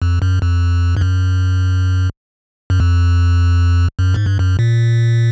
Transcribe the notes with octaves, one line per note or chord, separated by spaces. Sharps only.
F2
F#2
F2
G2
F#2
F#2
F2
F#2
G#2
G2
F#2
A#2